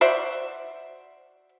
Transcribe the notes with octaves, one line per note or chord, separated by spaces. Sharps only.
F#4 C5 D5 E5